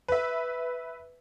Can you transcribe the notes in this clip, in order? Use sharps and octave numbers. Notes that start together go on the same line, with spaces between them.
B4 E5